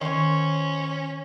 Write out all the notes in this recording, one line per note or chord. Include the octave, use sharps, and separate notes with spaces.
D#3 C#4 C5 C#5